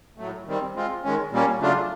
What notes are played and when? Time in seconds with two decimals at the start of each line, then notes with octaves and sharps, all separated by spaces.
0.18 A2 F#3 A3
0.46 D#3 G3 C4
0.75 G#3 C4 F4
1.04 D#3 G#3 C#4
1.32 A#2 G3 A#3 C#4
1.60 C#3 F#3 A3 D4 F4